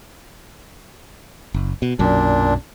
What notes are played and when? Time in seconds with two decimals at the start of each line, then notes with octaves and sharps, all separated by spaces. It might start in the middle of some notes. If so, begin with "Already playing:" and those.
1.54 F#1
1.82 B2
1.99 B1 F#2 A#2 D4